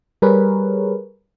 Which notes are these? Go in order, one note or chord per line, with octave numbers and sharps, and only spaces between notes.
G3 G#4 A#4 B4 C#5